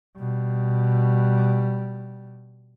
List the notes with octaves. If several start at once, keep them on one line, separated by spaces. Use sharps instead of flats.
B2 G3